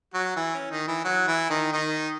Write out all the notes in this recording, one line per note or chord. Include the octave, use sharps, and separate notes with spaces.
F#3 F#4
E3 E4
C#4
D#3 D#4
E3 E4
F#3 F#4
E3 E4
D#3 D#4
D#3 D#4